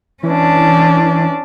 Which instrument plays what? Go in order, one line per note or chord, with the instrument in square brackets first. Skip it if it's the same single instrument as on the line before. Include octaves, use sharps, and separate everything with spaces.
[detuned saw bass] E3 [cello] C#4 D4